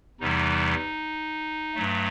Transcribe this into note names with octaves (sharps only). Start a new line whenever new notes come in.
E2 C3 E3 G3 D#4
G2 F#3 A3